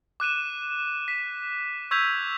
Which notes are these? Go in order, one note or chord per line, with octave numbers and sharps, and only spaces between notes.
D6 F#6 D#7 E7
B6
C#6 E6 G6 G#6 B6 F7